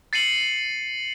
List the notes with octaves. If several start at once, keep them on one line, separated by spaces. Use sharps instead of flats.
A6 C7 C#7 D#7 F#7